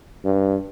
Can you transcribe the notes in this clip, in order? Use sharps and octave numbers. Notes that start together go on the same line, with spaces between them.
G2